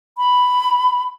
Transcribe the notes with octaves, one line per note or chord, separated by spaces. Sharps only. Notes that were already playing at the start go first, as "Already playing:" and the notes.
B5